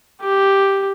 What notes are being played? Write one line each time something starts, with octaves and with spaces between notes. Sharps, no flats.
G4